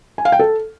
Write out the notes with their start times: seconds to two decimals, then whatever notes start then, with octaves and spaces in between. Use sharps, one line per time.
0.18 G#5
0.25 F5
0.32 G5
0.39 A4